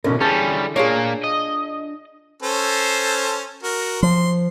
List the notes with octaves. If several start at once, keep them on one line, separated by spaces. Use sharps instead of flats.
B2 D3 E3 C#4 A#4
G3 C#4 G#4 G5 A5
A#2 A#3 D4 F4 G#4 C#5
D#5
C#4 A4 C5
F#4 A#4
F3 C6